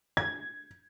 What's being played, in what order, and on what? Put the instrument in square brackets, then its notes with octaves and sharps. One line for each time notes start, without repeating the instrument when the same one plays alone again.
[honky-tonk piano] G#6